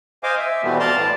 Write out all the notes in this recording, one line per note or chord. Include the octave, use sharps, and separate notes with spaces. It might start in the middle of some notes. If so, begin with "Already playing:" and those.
C5 D#5 F5 G#5 D6
E5
B2 E3 G3 A3 B3 C4
D5 F5 A5 A#5 C6
A2 A5